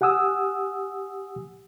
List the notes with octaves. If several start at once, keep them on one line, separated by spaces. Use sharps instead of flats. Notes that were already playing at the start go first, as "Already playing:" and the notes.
G4 F#5 G#5 D#6 E6